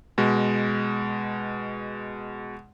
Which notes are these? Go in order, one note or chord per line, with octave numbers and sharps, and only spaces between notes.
B2 G#3